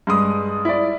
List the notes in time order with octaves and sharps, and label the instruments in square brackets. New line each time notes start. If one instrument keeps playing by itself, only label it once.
[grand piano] G2 G#3 D#6
E4 D5